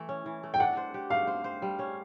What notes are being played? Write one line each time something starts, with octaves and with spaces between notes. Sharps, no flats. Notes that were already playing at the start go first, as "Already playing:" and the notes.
Already playing: E3 A3
C#4
E3
A3
G5
D4 F#5
C5
G4
A3 F5
C5
C5
G3
C#4